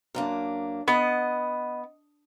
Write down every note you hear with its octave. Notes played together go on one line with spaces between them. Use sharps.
F#2 A#3 D4
B3 D#5